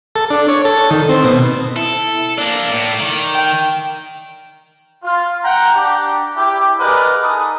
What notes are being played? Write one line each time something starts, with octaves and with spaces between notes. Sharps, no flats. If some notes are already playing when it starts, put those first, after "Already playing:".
A4
D4
C#5
A4
D#3
C4
B2
E4 A4
A#3 D4 D5
A2
D#3
G5
F4
F#5 G5 A#5
D4 G4
E4 G4
G#4 A#4 B4 D5 D#5 F#5
D#4 G#4 A4 D#6